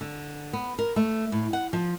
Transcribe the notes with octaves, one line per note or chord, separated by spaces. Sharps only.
D3
B3
A#4
A3
A2
F#5
F3